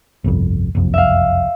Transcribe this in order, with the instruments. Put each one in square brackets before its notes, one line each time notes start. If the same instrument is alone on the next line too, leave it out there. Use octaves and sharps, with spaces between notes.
[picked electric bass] G1 C2 F2
F#1 C2 F2
[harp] E5 F5